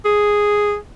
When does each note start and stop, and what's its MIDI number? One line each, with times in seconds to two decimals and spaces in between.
0.05 0.75 68